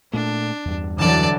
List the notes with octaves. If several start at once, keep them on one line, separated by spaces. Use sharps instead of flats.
A#2 A3 D4
E2 G2
D3 E3 F#3 D5 A5